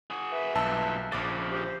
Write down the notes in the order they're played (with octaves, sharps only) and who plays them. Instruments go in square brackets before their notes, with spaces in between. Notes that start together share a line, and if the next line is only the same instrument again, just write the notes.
[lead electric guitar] F#4 G#4
[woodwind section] B4 E5
[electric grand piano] B1 A5 E6 [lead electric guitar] G2 A#2
[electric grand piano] A#1 D6 A6 [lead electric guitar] C#3 F3
[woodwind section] G4 C5